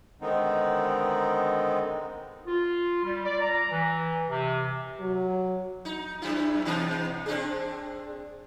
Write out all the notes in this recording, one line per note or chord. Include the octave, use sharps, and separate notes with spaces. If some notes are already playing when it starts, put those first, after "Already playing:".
D3 D#3 G#3 B3 C4 D#4
F4
G3
D5
A#5
E3
C3
F#3
D#4
F#2 E4
B2 E3 D#4
C4 D4 G#4